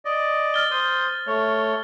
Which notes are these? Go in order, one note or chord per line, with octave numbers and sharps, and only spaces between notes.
D5 D#5
F6 A6 G7
C5 D#6
A3 C#5